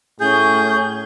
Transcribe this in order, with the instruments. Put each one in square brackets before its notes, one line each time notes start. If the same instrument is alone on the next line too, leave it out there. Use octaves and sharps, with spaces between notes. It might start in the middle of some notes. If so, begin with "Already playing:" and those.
[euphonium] A2 [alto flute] C#4 [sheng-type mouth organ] G#4 [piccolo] G6